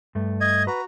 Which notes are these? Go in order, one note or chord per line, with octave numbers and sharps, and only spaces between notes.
G2 A3
D#5 G#6
F#4 B4 A#5